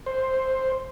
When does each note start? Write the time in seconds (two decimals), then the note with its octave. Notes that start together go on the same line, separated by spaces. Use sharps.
0.06 C5